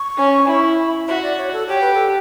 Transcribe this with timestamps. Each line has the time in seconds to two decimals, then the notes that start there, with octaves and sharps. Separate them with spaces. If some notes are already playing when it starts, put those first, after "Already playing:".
Already playing: C#6
0.18 C#4
0.47 E4
1.08 F#4 E5
1.23 D5
1.38 C#5
1.53 A4
1.68 G4 C#5
1.81 B4
1.94 A4